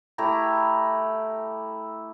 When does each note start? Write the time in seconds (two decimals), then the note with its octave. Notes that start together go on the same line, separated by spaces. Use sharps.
0.18 A3 E4 G4 A#5